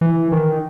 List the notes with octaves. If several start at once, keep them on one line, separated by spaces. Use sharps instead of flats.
E3
D#3